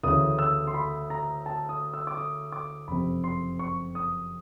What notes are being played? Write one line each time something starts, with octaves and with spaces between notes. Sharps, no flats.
D2 C#3 E3 D#6
E6
C6
B5
A#5
A5
D#6
E6
D6
D#6
D6
F#1 F2 C3 B5
C6
C#6
D#6